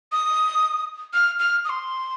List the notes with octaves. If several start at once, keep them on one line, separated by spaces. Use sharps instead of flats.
D#6
F6
F6
D#6
C6